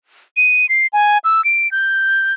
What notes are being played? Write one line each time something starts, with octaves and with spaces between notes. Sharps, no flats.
D#7
C7
G#5
E6
D7
G6